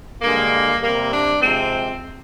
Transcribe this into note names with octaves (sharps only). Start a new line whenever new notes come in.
G2 D3 G#3 A#3
C3 G3 A#3
D4
C3 F3 G#3 C4